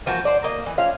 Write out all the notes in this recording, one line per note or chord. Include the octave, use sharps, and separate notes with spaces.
E3 F3 A#3 F#4
C5 D5
A#3 D#5
E3
F3 C#4 F5